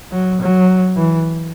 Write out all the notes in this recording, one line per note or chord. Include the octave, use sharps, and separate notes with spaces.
F#3
F#3
E3